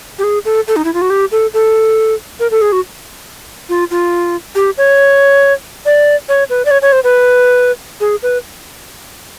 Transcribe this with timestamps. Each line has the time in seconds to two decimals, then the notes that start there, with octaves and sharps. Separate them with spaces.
0.19 G4
0.24 G#4
0.45 A4
0.68 A4
0.76 D#4
0.85 E4
0.94 F4
1.02 F#4
1.10 G4
1.32 A4
1.54 A4
2.40 A#4
2.51 A4
2.61 G#4
2.72 F#4
3.69 F4
3.91 F4
4.55 G4
4.78 C#5
5.86 D5
6.29 C#5
6.50 B4
6.65 D5
6.71 C#5
6.82 C#5
6.92 C5
7.04 B4
8.00 G#4
8.23 B4